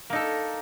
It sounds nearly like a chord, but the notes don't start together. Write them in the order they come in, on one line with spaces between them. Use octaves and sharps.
A#3 D#4 A4